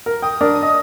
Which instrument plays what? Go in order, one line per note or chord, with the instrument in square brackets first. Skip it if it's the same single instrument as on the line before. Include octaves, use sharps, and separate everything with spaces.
[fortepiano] A#4
[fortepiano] G5 [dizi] D#6
[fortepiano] D4 A#4 D5
D#5